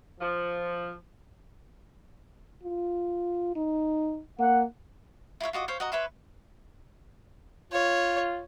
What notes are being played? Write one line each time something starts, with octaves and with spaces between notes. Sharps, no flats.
F3
F4
D#4
A#3 F#5
E4 F4 C#5 E5
F4 F#4 D#5 D6
C5 C#5 F5
F#4 D#5 A#5
B4 C#5 E5 C6
F4 C#5